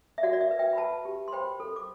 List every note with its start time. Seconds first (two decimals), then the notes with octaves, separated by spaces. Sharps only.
0.18 E5
0.23 F#4 D5 F#5
0.33 D5
0.41 E5
0.51 B4
0.59 E5 G5
0.73 B5
0.77 B4 F#5 A5
1.05 G4
1.28 C6
1.32 C5 G5 B5
1.60 A4
1.76 D6